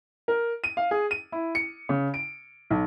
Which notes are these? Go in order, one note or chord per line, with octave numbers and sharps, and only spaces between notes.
A#4
D#7
F5
G#4
D#7
E4
C#7
C#3
D7
B1